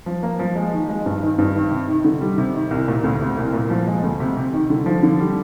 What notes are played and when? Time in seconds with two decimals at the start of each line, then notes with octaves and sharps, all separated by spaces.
0.06 F3
0.23 A#3
0.39 F3
0.56 G#3
0.73 D#3
0.89 G#3
1.06 G2
1.22 D#3
1.38 G2
1.55 D#3
1.71 C3
1.88 D#3
2.05 D3
2.21 G3
2.38 C3
2.54 D#3
2.71 C2
2.88 A#2
3.04 D2
3.21 C3
3.37 C2
3.53 A#2
3.70 F3
3.87 G#3
4.03 D2
4.20 C3
4.37 C3
4.53 D#3
4.70 D3
4.86 F3
5.03 D3
5.20 G3